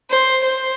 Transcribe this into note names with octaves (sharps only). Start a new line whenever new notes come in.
C5
C5